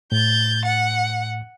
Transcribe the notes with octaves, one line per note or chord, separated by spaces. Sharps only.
A2 G6 A6
F#5